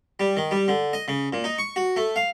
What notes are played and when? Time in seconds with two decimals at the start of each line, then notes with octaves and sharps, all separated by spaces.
0.20 G3
0.37 D#3
0.51 G3
0.68 D3
0.93 D#5
1.08 C#3
1.33 A#2
1.44 D#4
1.58 C#6
1.76 F#4
1.96 A3
2.16 F5